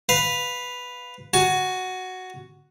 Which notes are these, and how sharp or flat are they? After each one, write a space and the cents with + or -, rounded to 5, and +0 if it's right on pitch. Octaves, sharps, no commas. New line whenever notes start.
B4 +0 F5 +5
F#4 +0 G#5 +30